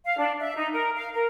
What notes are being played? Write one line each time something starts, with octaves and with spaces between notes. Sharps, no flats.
F5
D4
E5
D#4
A#4
F5
A#4